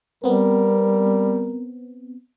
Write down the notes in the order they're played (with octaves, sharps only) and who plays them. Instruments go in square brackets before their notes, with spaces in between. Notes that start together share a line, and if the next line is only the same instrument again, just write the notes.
[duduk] G3 [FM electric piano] B3 C4 [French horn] A#4